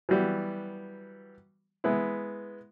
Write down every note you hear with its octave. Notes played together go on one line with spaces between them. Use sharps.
E3 F#3 G3 B3
G#3 B3 E4